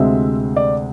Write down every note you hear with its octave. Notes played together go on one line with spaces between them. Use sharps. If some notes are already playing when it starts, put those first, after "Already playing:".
Already playing: D2 C3 G#3 C4 E5
D5